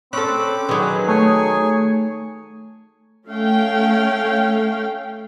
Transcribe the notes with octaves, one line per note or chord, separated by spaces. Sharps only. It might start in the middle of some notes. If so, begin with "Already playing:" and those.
C4 C#4 A4 B5 D6 F#6
D#3 F#3 G#4 B4
A3 C#5 G#5
A3 C#4 F5 G5